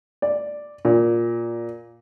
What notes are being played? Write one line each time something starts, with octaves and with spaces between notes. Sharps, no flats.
D5
A#2